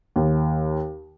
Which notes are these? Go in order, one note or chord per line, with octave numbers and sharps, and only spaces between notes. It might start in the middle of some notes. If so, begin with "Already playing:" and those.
D#2